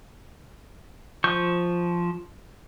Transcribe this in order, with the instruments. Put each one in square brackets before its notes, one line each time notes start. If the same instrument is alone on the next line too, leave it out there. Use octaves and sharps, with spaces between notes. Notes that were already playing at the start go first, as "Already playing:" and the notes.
[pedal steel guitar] F3 C#6 G6